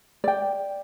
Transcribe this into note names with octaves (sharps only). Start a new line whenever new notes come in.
D5 G5